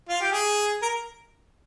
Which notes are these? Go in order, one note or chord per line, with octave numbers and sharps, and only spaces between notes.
F4
G4
G#4
A#4